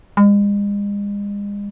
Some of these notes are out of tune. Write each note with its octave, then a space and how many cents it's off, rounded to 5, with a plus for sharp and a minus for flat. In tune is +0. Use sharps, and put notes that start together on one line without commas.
G#3 -40